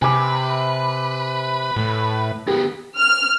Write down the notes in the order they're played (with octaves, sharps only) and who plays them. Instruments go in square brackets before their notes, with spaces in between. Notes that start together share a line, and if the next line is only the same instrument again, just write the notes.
[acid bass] C3 [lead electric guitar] B4 [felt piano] G#5 D6
[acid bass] A2
[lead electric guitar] D2 B3 [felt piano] G4
[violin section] F6